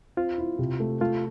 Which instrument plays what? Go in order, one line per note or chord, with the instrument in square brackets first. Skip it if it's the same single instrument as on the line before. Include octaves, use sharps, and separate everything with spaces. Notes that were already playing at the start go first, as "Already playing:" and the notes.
[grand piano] C4 [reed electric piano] F4
[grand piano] E4
C3
A3
[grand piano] A3 [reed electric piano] F4